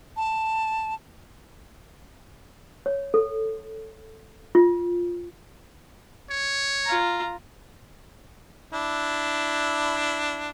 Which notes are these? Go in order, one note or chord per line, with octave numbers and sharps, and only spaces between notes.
A5
C#5
A4
F4
C#5
F4 A#5
D4 E4